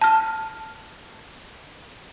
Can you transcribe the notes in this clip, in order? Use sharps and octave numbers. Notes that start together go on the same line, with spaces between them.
A5 F6